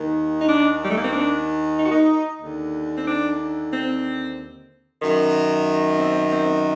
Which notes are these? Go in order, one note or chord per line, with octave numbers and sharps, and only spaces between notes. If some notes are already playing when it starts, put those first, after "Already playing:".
Already playing: D#2 D#3
D#4
D4
G3
A3
A#3
C4
D4
D#4
F#4
D#4
D#2 D3
C4
D4
C4
F#2 D#3
C4
C4